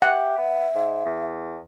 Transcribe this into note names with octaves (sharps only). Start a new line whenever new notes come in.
G4 E5 F#5
B3
G#2
E2